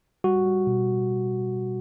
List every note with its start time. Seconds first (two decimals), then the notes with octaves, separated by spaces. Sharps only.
0.24 G3 F#4
0.45 G3
0.67 B2